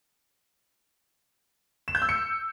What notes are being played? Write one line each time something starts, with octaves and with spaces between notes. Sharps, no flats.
E7
G6
E6
C#7